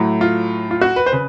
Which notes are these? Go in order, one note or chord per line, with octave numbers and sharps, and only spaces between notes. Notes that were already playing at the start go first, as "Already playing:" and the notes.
Already playing: A2 F#3 A3
F4
F4
F#4
B4
C5
C#3 B4